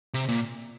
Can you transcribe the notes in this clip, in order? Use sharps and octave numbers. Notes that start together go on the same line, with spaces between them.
C3
A#2